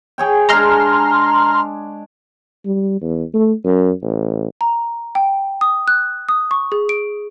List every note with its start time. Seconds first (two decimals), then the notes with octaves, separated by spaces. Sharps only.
0.18 G#4 C#5 G5
0.49 G#3 D4 A#5 C6 F6
2.66 G3
3.01 E2
3.34 A3
3.65 F#2
4.03 A1
4.61 A#5
5.15 G5
5.61 D#6
5.88 F#6
6.29 D#6
6.51 C#6
6.72 G#4
6.89 D7